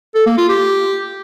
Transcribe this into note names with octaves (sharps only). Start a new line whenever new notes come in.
A4
A#3
F4
G4